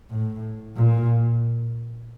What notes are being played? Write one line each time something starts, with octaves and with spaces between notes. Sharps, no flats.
A2
A#2